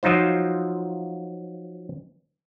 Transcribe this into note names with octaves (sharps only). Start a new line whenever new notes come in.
F3 F#3 D#4 F4 C5